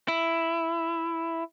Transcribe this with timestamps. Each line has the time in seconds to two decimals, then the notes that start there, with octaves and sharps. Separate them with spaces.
0.08 E4